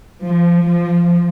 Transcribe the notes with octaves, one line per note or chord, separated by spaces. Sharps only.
F3
F3